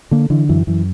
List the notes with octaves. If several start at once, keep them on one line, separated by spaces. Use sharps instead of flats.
D3 A#3
D3 E3
F#2 E3
F#2 E3